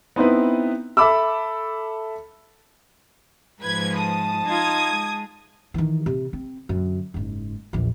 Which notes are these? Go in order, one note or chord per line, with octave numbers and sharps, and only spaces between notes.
B3 C4 D#4 E4 B4
A4 E5 A5 B5 D6 E6
G#2 F3 B4 G#6
A5 D#6
D#4 F4 D#6 G#6
G#3
D#3 E3
C3
C4
F#2 D3
F#1 G#2
A#1 E2